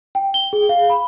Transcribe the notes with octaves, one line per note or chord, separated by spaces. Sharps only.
G5
G7
G#4
F5
B5